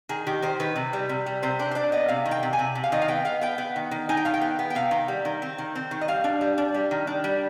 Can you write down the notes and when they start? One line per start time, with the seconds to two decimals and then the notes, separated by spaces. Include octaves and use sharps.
0.09 D#3 G#4
0.27 D#3 G4
0.42 D#3 C5
0.60 D#3 B4
0.76 C3
0.93 G3
1.09 C3
1.26 G3
1.42 C3 C5
1.59 D4 C5
1.71 C5
1.75 D4 D5
1.92 B3 D#5
2.08 C3 F5
2.25 D#3
2.31 G5
2.43 C3
2.53 G#5
2.59 C3
2.75 C3
2.84 F5
2.92 D#3 D#5
3.02 F5
3.08 B3 G5
3.25 B3 F5
3.41 B3 G5
3.58 B3
3.76 D#3
3.91 D#3
4.09 D#4 G#5
4.17 G5
4.25 D#3 F5
4.34 G5
4.41 B3
4.59 B3
4.70 G5
4.75 C3 F5
4.91 D#3
5.08 G3
5.25 D#3
5.42 C4
5.58 D#3
5.75 C4
5.91 D#3
6.01 D#5
6.08 G3 F5
6.24 D4
6.41 G3
6.58 D4
6.74 G3
6.91 D#3
7.07 D4
7.24 G3